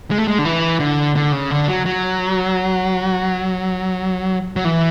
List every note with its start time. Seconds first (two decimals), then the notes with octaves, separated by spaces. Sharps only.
0.11 G#3
0.18 A3
0.28 G#3
0.39 D3
0.45 E3
0.80 D3
1.16 D3
1.32 C#3
1.51 D3
1.68 F#3
1.86 F#3
4.56 F#3
4.65 E3